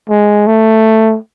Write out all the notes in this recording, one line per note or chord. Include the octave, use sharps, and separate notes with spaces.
G#3
A3